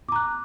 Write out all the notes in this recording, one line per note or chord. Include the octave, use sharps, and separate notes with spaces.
A#5 D6 F#6